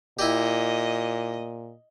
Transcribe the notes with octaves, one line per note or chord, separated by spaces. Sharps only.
A#2 E4 G4 D#5